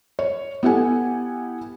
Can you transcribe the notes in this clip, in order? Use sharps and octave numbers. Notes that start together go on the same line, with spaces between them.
C#5
B3 E4 G4 A4 F#5 G#5